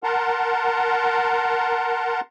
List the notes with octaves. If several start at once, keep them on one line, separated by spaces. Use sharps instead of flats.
A#4 F#5 A5 A#5 C6